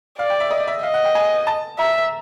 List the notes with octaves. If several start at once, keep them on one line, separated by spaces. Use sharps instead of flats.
D5 F5
G5
E5
D#5
E5
D#5 F5
F#5
G5
G#5
A5
E5 A#5